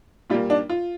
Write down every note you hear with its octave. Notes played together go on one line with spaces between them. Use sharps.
A#2 G3 A#3 F4
D4
F4